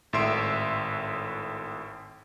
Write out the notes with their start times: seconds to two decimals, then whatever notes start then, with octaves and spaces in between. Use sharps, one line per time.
0.13 G#1 A2 E5 C6 E6 D7